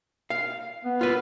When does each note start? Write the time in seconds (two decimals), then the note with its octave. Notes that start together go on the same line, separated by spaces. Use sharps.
0.30 F5
0.85 B3
1.01 F4 B4